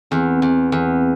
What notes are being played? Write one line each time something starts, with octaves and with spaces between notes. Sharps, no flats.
E2 C4
E2
E2